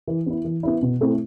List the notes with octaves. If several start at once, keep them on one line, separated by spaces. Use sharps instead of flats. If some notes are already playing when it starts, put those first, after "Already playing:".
E3
B3 E4
E3
B3 E4
B2
A3 C4 E4